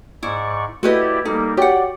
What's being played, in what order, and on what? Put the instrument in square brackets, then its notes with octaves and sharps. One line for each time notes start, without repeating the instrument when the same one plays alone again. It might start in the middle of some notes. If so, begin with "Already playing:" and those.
[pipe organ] G#2 D5 C#6 [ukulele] E4
[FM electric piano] A3 [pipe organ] E4 G4 D5 [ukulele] F#4 B4 D#5
[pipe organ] G3 A#3 [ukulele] D#4 [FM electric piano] A4
[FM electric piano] F#4 C#5 D6 [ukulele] G4 F#5 [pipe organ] D5